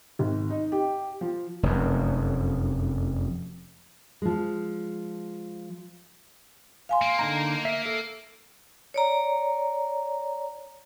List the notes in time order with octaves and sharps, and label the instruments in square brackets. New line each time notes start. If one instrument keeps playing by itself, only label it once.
[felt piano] G#1
D#4
G4
F3
[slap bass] F1 F#2
[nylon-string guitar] F3 G#3
[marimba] F5 G#5 C6
[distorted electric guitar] A#3
[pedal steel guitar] D3 D#4 A#5
E5
A4
[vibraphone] C#5 D5 A#5